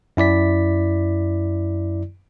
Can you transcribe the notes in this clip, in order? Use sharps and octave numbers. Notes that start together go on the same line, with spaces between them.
F#2 E4 D5 B6